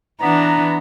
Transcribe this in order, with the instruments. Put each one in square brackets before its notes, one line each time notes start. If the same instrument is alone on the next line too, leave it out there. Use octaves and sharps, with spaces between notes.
[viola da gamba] E3 D4 [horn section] B3 A#5